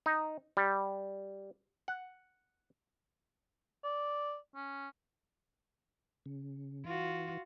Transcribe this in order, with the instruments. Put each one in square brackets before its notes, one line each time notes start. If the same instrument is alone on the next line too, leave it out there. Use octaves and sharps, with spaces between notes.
[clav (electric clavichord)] D#4
G3
F#5
[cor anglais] D5
C#4
[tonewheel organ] C#3
[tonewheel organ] E3 [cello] F4 F#4